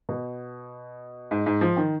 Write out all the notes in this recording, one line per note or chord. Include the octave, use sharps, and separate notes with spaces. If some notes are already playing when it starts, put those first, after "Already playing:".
B2
G#2
G#2
F3
D#3